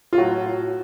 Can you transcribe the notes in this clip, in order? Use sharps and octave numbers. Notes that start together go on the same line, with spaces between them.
F4
A2 F#3 F#4